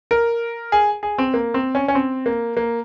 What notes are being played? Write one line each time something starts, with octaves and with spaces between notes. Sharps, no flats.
A#4
G#4
G#4
C4
A#3
C4
C#4
C#4
C4
A#3
A#3